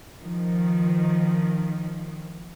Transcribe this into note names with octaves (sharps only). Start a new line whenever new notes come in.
D#3 F3